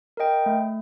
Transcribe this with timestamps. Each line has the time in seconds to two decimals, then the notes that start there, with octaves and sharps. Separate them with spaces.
0.17 A#4 D#5 G5
0.46 A3